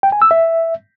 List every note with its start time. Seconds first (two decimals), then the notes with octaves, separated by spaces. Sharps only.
0.03 G5
0.12 G#5
0.22 E6
0.31 E5